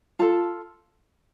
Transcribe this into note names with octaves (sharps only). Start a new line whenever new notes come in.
F4 A4 A5